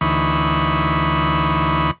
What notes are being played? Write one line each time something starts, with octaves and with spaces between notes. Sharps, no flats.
D2 E3 D#4 B5 C#6